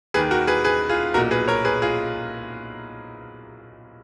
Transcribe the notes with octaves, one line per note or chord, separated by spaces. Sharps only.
D#2 D#3 G#4 B4
F#4 A#4
G#4 B4
G#4 B4
F4 G#4
B1 A#2 F#4 A#4
G#4 B4
A#4 C#5
G#4 B4
F4 G#4